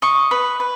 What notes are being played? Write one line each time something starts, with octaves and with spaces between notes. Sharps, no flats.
D#5 C#6
B4
B4